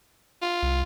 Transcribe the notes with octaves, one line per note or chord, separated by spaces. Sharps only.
F4
C2